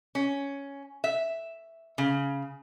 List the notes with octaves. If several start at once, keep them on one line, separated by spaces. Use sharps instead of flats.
C#4
E5
C#3